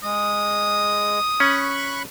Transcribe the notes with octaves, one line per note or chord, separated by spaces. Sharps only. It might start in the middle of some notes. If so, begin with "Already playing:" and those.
G#3 D#6
C#4 B5 C#6 F#6